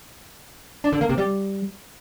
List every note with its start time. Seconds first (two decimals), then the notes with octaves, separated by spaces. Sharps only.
0.84 D4
0.93 D3
1.01 A#3
1.09 C3
1.18 G3